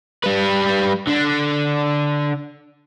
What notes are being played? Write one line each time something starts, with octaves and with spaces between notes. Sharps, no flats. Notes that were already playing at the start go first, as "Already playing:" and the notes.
G3 B4
D3 D4